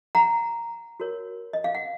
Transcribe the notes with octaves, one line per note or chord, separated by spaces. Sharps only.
F#5 A#5
F#4 A#4 C#5
D#5
F5
F#5